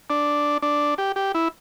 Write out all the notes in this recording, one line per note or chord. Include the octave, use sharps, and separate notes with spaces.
D4
D4
G4
G4
E4